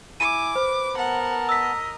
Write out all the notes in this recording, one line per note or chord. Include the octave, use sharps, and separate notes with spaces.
E4 G#5 D6 D#7
B4 C5
B3 A#4 F#5 A5
D#5 E6 B6